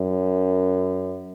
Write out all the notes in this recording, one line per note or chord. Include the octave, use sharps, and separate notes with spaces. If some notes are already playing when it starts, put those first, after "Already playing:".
Already playing: F#2